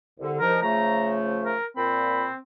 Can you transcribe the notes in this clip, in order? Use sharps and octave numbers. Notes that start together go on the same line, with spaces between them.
C2 D3
C2 D#3 F3 A#4
C#3 F3 A3 A#5
A#4
A#2 C4 B5